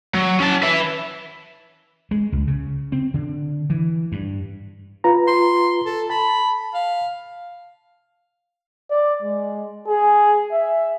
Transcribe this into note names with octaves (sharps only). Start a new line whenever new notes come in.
F#3
C#4 A5
B4 E5
G#3
C#2
C#3
C4
D3
E3
G2
F4 B4 A#5
C6
A4
A5 B5
F5
D5
G#3
G#4
E5